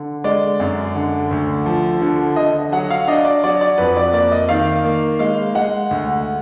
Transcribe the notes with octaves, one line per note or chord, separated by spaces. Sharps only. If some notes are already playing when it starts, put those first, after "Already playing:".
Already playing: D3
G#3 D5
F#2
D3
D2
F3
D3
D3 D#5
F#3 F#5
F5
D4 D#5
D5
F#3 D5
D5
F2 B4
D5
A#3 D5
D#5
D#3 F5
A#3
G#3 F5
G#3 F#5
D2